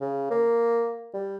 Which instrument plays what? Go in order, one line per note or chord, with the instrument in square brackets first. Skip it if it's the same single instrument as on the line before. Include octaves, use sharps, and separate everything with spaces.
[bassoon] C#3
A#3
G3